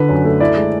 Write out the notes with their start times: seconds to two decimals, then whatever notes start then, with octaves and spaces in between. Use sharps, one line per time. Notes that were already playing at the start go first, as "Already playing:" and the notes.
Already playing: D3 D4 B4
0.09 F#2
0.25 A3
0.40 E4 D5
0.57 G#3